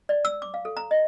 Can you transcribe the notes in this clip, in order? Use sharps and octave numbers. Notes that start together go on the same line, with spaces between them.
D5
E6
D6
F5
A4
A#5
D#5